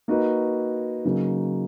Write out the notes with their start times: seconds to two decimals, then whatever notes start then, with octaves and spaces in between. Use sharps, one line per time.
0.08 A#3 D#4 F#4 B4
1.05 C#3 F#3 A#3 D#4